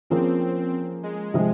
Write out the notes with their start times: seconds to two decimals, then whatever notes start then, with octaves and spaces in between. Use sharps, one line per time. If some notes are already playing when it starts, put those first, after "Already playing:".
0.10 F3 A#3 C4 C#4 F4 G#4
1.03 G#3
1.34 C3 F3 G#3